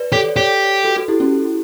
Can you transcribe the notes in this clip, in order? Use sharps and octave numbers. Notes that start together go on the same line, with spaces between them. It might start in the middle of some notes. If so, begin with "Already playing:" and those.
Already playing: B4 D5
G4 A4 C#5
D5
G4 A4 C#5
F#4 A4
F#4 A4
E4 G4
C#4 E4